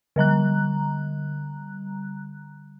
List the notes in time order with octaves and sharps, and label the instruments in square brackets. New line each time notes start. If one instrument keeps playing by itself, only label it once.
[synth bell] D3 G3 A#5 F#6